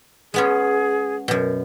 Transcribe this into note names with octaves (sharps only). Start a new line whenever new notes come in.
G#3 B3 C#4 G#4
F#2 B2